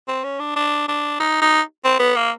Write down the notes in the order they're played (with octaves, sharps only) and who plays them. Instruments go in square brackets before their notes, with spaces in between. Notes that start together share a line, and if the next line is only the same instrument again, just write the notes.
[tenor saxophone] C4
C#4
D4
D4
D4
D#4
D#4
C4
B3
A#3